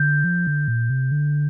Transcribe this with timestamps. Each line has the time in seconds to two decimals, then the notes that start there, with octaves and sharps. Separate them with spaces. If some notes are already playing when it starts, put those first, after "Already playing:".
Already playing: D3 G6
0.24 F3
0.47 D3
0.68 A#2
0.90 C3
1.12 D3